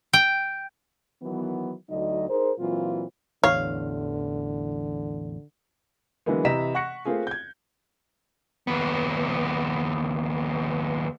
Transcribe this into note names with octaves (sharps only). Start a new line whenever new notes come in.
G5
D#3 E3 F#3 B3
D2 D3 F#3 D#4 D#5
D#4 G#4 A#4 C5
A#2 E3 F#3 C4 F4
A1 E2 D3 C#5 F5
D3 E3 F#3 G#3 A#3 B3
C3 E3 D#5 A#5 B6 E7
F#5 C#6 F#6 A#6 C#7
A3 A#3 C4 F4 G#4
G6 G#6
D#2 B3